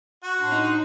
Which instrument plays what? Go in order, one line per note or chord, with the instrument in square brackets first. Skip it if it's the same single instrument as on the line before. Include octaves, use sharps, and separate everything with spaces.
[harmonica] F#4 [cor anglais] F#5
[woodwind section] A2 D4 C6
[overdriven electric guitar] D#4